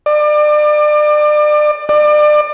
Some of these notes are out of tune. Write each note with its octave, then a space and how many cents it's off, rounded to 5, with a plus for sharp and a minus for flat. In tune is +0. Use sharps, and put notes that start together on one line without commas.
D5 +35
D5 +35